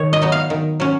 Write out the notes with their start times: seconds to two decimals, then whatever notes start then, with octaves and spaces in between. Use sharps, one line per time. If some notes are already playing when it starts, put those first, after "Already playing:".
Already playing: D#3 C#5
0.13 D#5
0.22 F#3 B3 D#4
0.32 F5
0.50 D#3
0.80 F#3 C#4